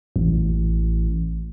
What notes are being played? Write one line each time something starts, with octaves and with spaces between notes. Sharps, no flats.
A1